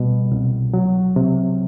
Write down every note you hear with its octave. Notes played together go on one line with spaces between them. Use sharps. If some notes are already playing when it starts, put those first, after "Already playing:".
Already playing: B2 G3
C2
F#3
C3